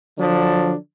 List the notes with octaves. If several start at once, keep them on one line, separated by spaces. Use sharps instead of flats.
D3 F3 F#3 D4